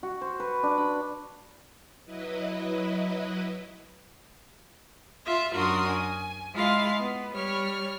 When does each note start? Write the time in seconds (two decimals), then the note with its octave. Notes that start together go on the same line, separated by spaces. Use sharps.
0.03 F#4
0.21 C5
0.40 B4
0.63 D4
0.78 B5
2.05 F#3 E4 B4 D#5
5.26 F4 E5
5.54 F#2 D4 F#4 A#4 C6 D#6
5.87 G#5
6.54 G#3 E4 F4 F5 C6
6.99 B3
7.35 G3 C#5 F6